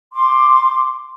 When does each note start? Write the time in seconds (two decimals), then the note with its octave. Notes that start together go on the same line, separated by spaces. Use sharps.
0.13 C6 D6